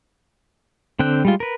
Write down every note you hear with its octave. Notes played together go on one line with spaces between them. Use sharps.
D3 C4 G5 F#6
G3 G#3 F4
A#4 B4